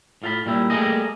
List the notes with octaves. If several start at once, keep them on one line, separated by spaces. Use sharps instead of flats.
A2 F4 F5 A5 B5
A#2 G3 E4
G3 A3 A#3 G#4 D#5